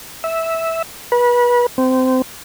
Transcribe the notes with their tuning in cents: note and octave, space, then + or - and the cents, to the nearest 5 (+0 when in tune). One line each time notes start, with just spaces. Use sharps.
E5 -10
B4 -30
C4 -20